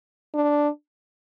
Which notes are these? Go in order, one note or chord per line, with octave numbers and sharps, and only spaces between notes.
D4